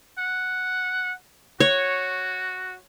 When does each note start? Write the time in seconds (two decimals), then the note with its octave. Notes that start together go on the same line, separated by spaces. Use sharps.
0.19 F#5
1.60 F#4 C#5